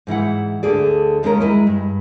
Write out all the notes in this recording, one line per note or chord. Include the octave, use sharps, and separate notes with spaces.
G#2 E3 E4 F#5
D2 D3 G#4 A4 D5
D#2 G#3 A3 C#4 F#4 A#4
G#3 E4 D#5
G2